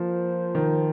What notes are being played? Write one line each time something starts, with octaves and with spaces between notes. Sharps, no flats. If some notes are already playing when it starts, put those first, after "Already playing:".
Already playing: F3 A#3 F4 C5
D#3